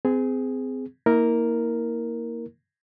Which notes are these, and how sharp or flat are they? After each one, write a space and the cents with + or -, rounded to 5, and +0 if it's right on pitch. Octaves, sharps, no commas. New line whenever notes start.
C4 -30 G#4 +0
A#3 +0 E4 -35 A#4 +0